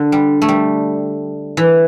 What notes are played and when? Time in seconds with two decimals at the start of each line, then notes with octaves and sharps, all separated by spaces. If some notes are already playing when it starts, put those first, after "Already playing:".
Already playing: D3
0.12 G3
0.42 A3
0.49 G3
1.57 E3